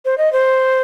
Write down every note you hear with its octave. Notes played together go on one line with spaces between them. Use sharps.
C5
D#5
C5